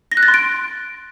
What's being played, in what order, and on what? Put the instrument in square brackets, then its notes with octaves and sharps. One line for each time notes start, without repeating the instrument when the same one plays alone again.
[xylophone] A#6
F#6
A6
C6
D7